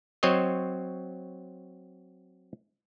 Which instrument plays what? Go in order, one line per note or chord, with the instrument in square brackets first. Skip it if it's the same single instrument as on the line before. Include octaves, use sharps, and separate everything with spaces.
[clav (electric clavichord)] F#3 C4 C5 C#5 D#5